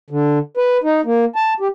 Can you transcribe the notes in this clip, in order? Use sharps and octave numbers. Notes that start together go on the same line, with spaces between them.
D3
B4
D#4
A#3
A5
G4